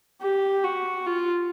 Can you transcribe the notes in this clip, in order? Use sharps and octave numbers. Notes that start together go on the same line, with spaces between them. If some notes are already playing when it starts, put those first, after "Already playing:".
G4
F#4
F4